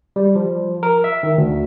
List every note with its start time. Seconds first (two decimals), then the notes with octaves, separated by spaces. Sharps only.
0.16 G3
0.35 F3
0.83 A#4
1.04 E5
1.23 D#3
1.38 D2